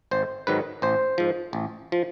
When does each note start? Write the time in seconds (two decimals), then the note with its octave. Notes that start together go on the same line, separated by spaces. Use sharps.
0.11 G#1 C5
0.47 G#2 D#3 F#3 B4
0.82 A1 C5
1.18 G#2 F3
1.53 A1
1.92 F3